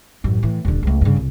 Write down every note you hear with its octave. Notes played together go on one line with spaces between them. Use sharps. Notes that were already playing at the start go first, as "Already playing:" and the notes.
A1 F#2
A2 E3
D#1 D3
C#2 A3
G2 C#3
C2